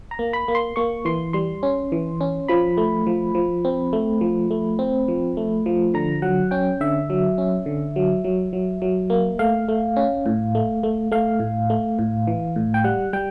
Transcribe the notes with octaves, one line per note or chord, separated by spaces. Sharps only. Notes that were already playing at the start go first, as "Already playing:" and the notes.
A#5
A#3
B5
A#3
C6
A#3 C#6
E3 C6
G3 C6
C#4
E3
C#4
F3 B5
A3
F3
F3
C4
A3
F3
A3
C4
F3
A3
F3
D3 A#5
F#3 F#5
C#4 G5
D3 E5
F#3
C#4
D3
F#3
F#3
F#3
F#3
A#3
A3 F5
A3
C#4
A2
A3
A3
A3 F5
A2
A3
A2
E3
A2
G5
G3 F#5
G3 G5